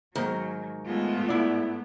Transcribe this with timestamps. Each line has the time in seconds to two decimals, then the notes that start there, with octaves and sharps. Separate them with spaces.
0.16 G#2 D#3 F#3 A#3
0.87 G#3 A3 B3 F4
1.29 G#2 E4 D5